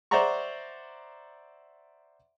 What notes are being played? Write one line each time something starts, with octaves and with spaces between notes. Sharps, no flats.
C5 D5 E5 F#5 A#5 C#6